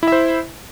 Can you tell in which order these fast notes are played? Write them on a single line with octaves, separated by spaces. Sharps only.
E4 E5 C5